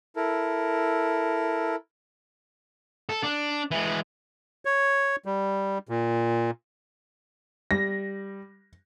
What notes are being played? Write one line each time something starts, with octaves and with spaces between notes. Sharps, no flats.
E4 A4 A#4
A4
D4
E3 G#3
C#5
G3
A#2
G3 A#6